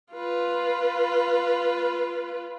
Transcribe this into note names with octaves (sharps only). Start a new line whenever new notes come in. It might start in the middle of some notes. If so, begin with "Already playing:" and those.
F4 B4